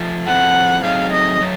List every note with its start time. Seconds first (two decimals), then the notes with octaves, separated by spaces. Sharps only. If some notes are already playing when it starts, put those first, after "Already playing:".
Already playing: F3 A3
0.27 F3 A3 C4 E4 A4 F#5
0.83 F#3 A3 C4 D#4 G#4 F5
1.12 D#5
1.40 F#3 A3